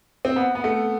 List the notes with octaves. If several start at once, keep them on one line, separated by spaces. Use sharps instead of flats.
C4
B3
B3
A3